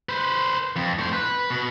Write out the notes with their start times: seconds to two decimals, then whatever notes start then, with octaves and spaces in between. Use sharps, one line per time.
0.09 B4 C5
0.76 F2
0.99 A2 C5
1.13 B4
1.50 B2